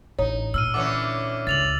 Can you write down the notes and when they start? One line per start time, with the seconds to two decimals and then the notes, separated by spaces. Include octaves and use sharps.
0.19 A1 D#4 C#5
0.54 A#2 E6 F6 D#7
0.74 D3 E3 C#4 D6
1.47 C#2 A6 F7 F#7